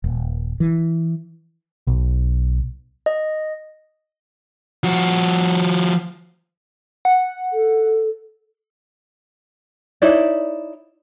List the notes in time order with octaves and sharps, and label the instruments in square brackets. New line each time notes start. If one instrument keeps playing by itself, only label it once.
[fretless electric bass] D#1
E3
[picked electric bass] B1
[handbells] D#5
[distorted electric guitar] F3 F#4
[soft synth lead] F#5
[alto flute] A4
[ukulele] D#4 E4 C#5 D5